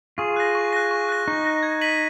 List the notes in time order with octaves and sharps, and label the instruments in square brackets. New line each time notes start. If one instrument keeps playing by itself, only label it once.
[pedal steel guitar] F4 G#4 [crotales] C#6
[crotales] F#6 A#6
C#6
F#6 A#6
C#6
F#6 A#6
[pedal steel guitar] D#4 [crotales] C#6
[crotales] F#6 A#6
G#6
B6 D#7 F#7